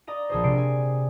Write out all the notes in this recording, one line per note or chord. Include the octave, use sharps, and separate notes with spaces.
D5 D#5 A#5 D#7
A#1 G#4 C5
C3 C7 D7
G#5